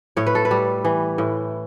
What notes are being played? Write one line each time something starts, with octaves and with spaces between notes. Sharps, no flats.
A2 C#5
B4
A4
B4
G3
E3
A2